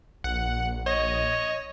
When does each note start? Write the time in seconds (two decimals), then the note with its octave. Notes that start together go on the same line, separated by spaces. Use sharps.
0.24 A#1 F#5
0.86 C#5 D#5